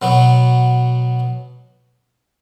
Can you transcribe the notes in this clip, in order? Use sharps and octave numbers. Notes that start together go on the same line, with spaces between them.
B2 F#3 B3